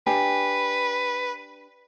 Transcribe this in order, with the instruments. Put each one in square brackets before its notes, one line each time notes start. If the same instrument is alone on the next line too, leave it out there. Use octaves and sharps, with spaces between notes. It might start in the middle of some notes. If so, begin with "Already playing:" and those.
[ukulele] D4 G4 G#5 [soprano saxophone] B4